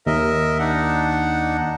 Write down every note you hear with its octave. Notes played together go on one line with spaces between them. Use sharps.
D#2 A#4 D#5 E5
D4 D#4 F#5